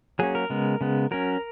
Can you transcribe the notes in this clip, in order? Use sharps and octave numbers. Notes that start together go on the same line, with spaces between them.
F#3 A#3 C#4 G#4
A#4
C#3 G#3 B3
C#3 G#3 B3
F#3 C#4 A#4